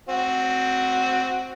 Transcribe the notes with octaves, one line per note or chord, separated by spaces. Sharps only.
C4 F#4